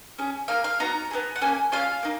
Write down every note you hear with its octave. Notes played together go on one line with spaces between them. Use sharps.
C#4 G#4
A#3 D#4 G#4 F5
F5
B3 D#4 F#4 A#5
B3 D#4 G#4
F#5
A#3 C#4 G#4 G#5
C#4 F4 G#4 F5
A#3 D#4